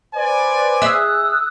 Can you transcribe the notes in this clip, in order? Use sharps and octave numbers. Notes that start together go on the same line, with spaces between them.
B4 C5 D5 G#5
G#4 E5 D#6 E6 F#6